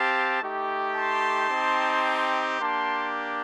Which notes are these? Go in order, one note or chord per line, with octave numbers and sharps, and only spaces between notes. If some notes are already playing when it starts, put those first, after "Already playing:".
Already playing: C4 G4 F5 A5
A3 D#4 G4
A5 C6
C4 D#4 G4
A#3 D4 G4 A5 C6